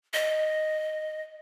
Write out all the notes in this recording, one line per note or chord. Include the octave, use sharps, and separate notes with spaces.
D#5